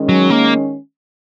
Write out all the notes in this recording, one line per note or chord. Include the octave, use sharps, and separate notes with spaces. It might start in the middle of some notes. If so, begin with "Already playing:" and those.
Already playing: D#3 G#3 C#4
F#3
A#3